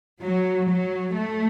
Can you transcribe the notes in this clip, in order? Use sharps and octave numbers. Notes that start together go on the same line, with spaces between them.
F#3
F#3
A3